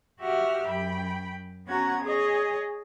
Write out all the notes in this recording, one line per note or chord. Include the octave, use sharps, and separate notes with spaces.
F#4 G4 E5 F#5 F6
F#2 G5 B5
B3 C#4 F#4 F#5 A#5 G#6
G#4 C#5 D#5